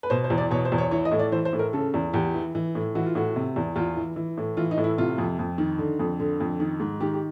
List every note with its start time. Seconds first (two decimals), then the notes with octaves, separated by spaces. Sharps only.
0.03 B4
0.10 B2 C5
0.24 C5
0.30 E2
0.38 D5
0.51 B2 C#5
0.65 C5
0.72 E2
0.78 C#5
0.91 E3 C#5
1.05 D#5
1.11 A2
1.19 D5
1.32 E3 C5
1.45 C5
1.53 A2
1.59 A#4
1.73 C#3 A4
1.94 E2
2.13 E2 G4
2.34 E3
2.55 E3
2.75 A2
2.95 E3 F#4
3.06 F4
3.15 A2 F#4
3.36 C3
3.56 E2
3.76 E2 F4
3.97 E3
4.16 E3
4.37 A2
4.57 E3 F4
4.71 D#4
4.78 A2
4.84 E4
4.98 C3 F4
5.18 F2
5.39 F2
5.58 D#3
5.78 D3
5.99 F2
6.20 D3
6.40 F2
6.60 D#3
6.80 G#2
7.00 D#3 G4
7.14 G4